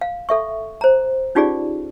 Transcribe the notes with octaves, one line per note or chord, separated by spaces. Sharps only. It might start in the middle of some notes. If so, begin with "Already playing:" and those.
F5
A4 E5 C#6
C5 A#5
C#4 D#4 F4 G4 G#4 D5